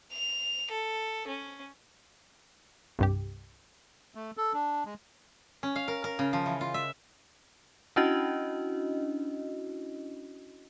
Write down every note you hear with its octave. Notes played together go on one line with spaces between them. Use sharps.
F7
A4
C#4
C2 G2 G4
A3
A4
D4
G#3
C#4
F5
A#4
A#4
C#3
F3
E3
F4
E5
C#4 D4 E4 F#4 D#5